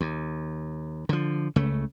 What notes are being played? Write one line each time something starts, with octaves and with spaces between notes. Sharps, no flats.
D#2
D3 F3
C#2 C#3 A3